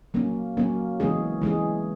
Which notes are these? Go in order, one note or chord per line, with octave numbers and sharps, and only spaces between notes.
F#3 A#3 C#4
F#3 A#3 C#4
E3 G#3 C#4 G#4
E3 G#3 C#4 G#4